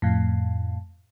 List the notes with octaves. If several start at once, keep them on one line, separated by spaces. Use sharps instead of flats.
F2 A2